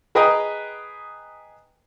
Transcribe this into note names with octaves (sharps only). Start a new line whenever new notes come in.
G#4 B4 D#5 G5 A#5 D#6